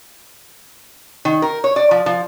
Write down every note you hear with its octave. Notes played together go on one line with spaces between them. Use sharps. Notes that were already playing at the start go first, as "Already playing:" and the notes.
D#3
A#4
C#5
D5
F3
F3